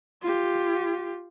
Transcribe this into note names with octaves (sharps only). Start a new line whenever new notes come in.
F4 G4